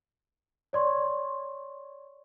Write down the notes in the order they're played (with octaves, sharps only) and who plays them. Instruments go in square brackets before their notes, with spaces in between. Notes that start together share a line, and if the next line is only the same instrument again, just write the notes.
[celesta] C#5 D5 C6 C#6